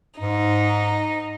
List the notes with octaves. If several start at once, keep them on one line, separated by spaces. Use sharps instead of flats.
G#2 D#4